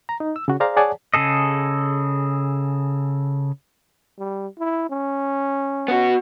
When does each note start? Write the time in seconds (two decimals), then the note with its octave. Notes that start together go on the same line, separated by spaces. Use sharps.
0.09 A#5
0.20 D#4
0.36 E6
0.48 C#3 F#4
0.60 G#4 C5 D5 F5 A#5
0.77 G#4 C#5 D5 F#5 G#5 A5
1.14 C#3 G#4 A4 D#5
4.19 G3
4.58 E4
4.90 C#4
5.88 B3 F#4